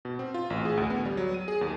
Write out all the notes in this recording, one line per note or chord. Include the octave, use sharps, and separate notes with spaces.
B2
C4
F4
A1
G#4
D2
B3
G3
F#3
D#7
G#4
D#2